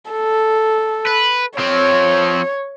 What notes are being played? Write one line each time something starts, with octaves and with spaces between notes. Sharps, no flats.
A4
B4
F3 C4 C#5